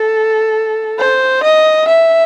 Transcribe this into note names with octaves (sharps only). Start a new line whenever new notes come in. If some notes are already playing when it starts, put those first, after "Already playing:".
Already playing: A4
C5
D#5
E5